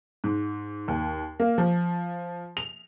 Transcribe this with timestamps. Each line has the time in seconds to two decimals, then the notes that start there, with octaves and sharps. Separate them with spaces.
0.24 G#2
0.88 D#2
1.40 A#3
1.58 F3
2.57 F7